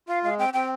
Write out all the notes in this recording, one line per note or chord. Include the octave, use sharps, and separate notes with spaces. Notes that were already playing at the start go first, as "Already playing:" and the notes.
F4 F5
G#3 F5
C4 G5
C4 G5